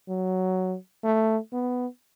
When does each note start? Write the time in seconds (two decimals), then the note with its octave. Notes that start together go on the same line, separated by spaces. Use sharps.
0.09 F#3
1.04 A3
1.53 B3